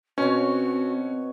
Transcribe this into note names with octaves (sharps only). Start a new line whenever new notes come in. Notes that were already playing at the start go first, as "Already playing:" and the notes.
B2 C4 C#4 F#4 C#5